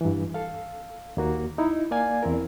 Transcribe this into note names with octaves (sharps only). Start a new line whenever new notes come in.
G2 E3
A4 F5
D#2 A#3 F#4
D#4 E4
A#3 D5 F5 G#5 G#6
E2 C4 E4 A#4